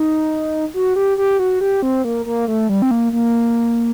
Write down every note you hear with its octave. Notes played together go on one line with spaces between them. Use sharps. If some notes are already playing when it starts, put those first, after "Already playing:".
Already playing: D#4
F#4
G4
G4
F#4
G4
C4
A#3
A#3
A3
G3
C4
A#3
A#3